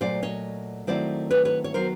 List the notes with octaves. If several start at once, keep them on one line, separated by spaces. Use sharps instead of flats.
A#2 F#3 A3 C5 D5
C#5 D#5
D#3 F#3 A3 C4 E4 C5 D5
B4 C#5
B4 C#5
C#5
D#3 F#3 B3 A#4 C5